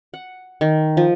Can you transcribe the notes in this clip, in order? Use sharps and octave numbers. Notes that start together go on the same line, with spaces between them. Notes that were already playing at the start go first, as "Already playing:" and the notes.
F#5
D#3
F3